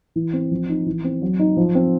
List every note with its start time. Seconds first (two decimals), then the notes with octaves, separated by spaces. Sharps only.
0.16 E3
0.33 C4
0.51 F3
0.69 D#4
0.86 E3
1.04 C4
1.22 F#3
1.40 D#4
1.57 F3
1.75 C4